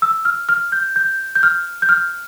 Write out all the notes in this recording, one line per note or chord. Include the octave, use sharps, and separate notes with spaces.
E6
F6
F6
G6
G6
G6
F6
G6
F6